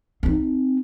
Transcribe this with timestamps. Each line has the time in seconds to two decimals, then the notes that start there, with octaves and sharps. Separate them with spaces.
0.23 C4 D#4